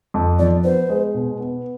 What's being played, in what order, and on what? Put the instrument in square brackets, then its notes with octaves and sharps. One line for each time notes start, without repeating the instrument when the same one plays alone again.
[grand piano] F2
[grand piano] F3 [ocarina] D5
[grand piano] B3 [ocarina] C5
[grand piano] G#3
B2
B3